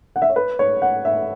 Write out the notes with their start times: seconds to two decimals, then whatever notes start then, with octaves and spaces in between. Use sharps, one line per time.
0.16 F#5
0.22 E5
0.30 C#5
0.36 B4
0.59 C#5
0.82 F#5
1.05 E5